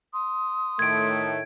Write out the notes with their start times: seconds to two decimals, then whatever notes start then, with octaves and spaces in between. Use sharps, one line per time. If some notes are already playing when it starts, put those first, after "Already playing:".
0.13 C6 D#6
0.79 A2 D#3 A3 G#6 D7